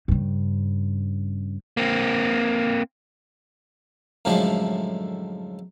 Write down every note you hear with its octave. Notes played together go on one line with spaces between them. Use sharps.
G2 C#3
A#3 C4
F#2 A2 D3 F3 G#3 A3